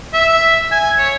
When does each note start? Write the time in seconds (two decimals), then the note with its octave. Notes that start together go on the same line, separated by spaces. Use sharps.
0.13 E5
0.72 G#5
0.98 C#5